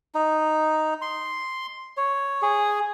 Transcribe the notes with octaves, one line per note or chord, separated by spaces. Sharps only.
D#4
C6
C#5
G#4